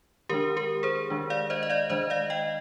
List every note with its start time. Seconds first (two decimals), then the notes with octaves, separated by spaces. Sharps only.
0.29 D#3 G#3 D4 G4 A#4
0.57 G4 A#4
0.83 G#4 C5
1.10 D#3 G#3 D4
1.30 D5 F5
1.50 C5 D#5
1.63 D#5
1.70 D5 F5
1.90 D#3 G#3 D4 C5 D#5
2.10 D5 F5
2.30 D#5 G5